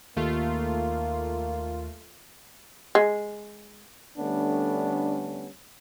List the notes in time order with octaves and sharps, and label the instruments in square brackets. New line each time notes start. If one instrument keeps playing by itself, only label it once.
[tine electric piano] D#2 [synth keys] A3 F4 [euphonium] A#3
[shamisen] G#3
[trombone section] D3 G3 A3 B3 C#4 D4